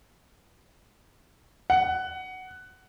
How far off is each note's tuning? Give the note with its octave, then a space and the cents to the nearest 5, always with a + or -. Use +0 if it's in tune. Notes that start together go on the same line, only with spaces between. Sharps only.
F#5 +10